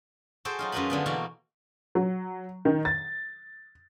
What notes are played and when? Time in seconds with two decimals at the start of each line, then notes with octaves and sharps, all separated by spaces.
0.45 F#4 G#4 A4 C5 G5
0.59 F#3 D#4 F4
0.72 F#2 G#3 F4 A#4 B4 B5
0.90 D3 F3 B3
1.06 B2 E3 A3 A#3 F#4
1.95 F#3
2.65 D#3
2.85 A6